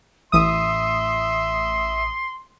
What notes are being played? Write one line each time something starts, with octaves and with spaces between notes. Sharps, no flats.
A1 E5 C6 D#6